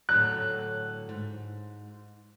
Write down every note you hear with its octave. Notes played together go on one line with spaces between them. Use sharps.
A2 D3 F#3 F#6
G#2